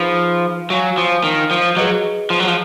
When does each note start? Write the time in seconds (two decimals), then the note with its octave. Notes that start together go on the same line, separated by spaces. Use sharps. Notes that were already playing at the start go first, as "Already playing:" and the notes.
Already playing: F3 D#4 G#4 B4 F5 B5
0.70 F#3 C#5 F5 G#5 C#6
0.98 F3
1.24 D#3
1.51 F3
1.76 F#3 G#4 B4 D#5
2.30 F3
2.40 F#3
2.48 F3